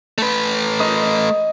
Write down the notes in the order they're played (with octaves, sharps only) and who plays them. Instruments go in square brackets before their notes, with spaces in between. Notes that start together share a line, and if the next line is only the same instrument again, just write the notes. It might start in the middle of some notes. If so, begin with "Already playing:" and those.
[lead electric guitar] A3 B4
[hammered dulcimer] D#5